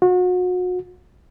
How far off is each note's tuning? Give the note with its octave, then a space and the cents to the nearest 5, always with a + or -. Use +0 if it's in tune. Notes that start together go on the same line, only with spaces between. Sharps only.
F#4 -35